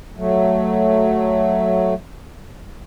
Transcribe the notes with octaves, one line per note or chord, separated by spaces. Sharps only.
F#3 A3